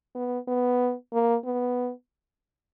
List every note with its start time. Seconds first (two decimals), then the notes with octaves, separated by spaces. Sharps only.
0.15 B3
0.48 B3
1.13 A#3
1.45 B3